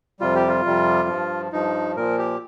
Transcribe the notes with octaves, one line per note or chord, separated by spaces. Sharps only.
F2 C3 G3 F4
G4
F4
F2 C3 G3
G2 F3
G2 F3 D#4
A#2 F3 A#4
G4